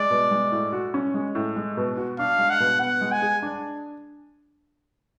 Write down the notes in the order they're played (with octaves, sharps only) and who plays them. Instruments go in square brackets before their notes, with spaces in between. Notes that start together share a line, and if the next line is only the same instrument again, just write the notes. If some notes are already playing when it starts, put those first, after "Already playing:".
Already playing: [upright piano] G#3 [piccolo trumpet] D5
[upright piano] B2
G#3
A2
F#4
C#4
G#3
A2
G#3
B2
F#4
[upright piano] D4 [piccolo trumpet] F5
[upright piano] G#3
[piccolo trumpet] F#5
[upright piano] B2
[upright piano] B3 [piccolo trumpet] F#5
[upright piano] G#3
[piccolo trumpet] G#5
[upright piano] G#4
D4